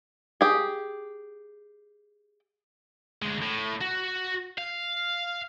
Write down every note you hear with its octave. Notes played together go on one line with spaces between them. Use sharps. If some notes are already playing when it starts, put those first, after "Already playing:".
G4 G#4
D2 G#3
A2
F#4
F5